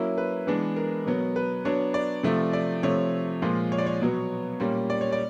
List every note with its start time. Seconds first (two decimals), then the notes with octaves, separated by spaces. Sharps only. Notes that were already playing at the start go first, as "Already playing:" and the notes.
Already playing: F#3 A#3 C#4 E4
0.18 B4
0.47 E3 G#3 B3 D4
0.76 A#4
1.06 B2 F#3 B3
1.36 B4
1.65 F#3 B3 D4 C#5
1.94 D5
2.23 C3 F3 A3
2.53 D5
2.83 C3 F3 A3 C#5
3.42 A#2 F3 G#3
3.72 C#5
3.78 D5
3.86 C#5
4.01 B2 F#3 B3
4.60 A#2 G3 A#3 C#4
4.90 D5
5.01 C#5
5.12 D5